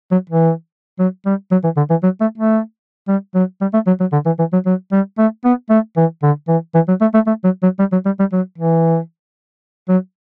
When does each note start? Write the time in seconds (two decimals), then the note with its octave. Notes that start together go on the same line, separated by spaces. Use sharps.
0.12 F#3
0.30 E3
0.99 F#3
1.26 G3
1.52 F#3
1.64 E3
1.77 D3
1.90 E3
2.03 F#3
2.21 A3
2.38 A3
3.08 G3
3.35 F#3
3.61 G3
3.74 A3
3.87 F#3
4.00 F#3
4.13 D3
4.26 E3
4.39 E3
4.53 F#3
4.66 F#3
4.92 G3
5.18 A3
5.45 B3
5.70 A3
5.97 E3
6.23 D3
6.48 E3
6.75 E3
6.88 F#3
7.01 A3
7.14 A3
7.27 A3
7.44 F#3
7.63 F#3
7.79 G3
7.92 F#3
8.06 G3
8.19 G3
8.33 F#3
8.58 E3
9.89 F#3